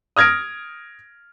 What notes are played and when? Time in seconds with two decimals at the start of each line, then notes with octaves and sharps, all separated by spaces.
0.16 D#6 F6 G#6 A#6 D7